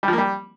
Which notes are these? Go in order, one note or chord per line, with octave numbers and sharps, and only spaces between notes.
G3
F3
A#3
G3